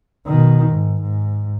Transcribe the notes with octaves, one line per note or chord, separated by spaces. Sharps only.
B2 D#3
G#2
G#2